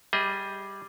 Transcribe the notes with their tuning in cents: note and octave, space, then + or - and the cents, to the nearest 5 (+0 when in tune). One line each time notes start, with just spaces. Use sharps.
G3 +0 G#4 +0 D#5 +40